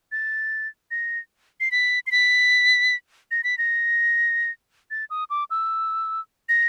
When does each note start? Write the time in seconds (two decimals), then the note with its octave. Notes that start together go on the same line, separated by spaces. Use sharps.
0.12 A6
0.91 A#6
1.60 C7
1.72 B6
2.07 C7
2.12 B6
3.31 A#6
3.44 B6
3.58 A#6
4.91 A6
5.10 D#6
5.30 D6
5.51 E6
6.49 A#6